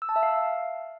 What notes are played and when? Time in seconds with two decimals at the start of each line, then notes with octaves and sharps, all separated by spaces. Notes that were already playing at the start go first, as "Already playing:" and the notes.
0.02 E6
0.09 A5
0.16 E5
0.23 F5